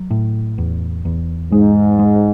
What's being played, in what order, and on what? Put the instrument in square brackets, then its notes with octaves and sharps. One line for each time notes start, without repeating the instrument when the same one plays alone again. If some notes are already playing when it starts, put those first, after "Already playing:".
Already playing: [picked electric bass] F#3
A2
E2
E2
[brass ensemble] G#2 [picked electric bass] G#3
[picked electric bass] G#3